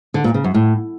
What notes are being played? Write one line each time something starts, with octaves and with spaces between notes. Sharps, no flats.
D3
A#2
C#3
F#2
A2